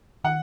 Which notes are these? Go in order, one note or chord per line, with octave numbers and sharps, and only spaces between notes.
D#3 F#5